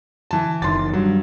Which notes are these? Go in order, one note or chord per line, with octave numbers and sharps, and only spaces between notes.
E3 A5
F#1 D#3 E3 C6 A6
G2 F#3